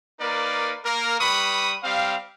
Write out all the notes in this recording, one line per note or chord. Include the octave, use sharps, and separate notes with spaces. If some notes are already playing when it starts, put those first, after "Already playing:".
A#3 D#4 A#4 B4 D5
A#3 A#4
G3 B4 B5 C#6 D#6
G3 C4 F5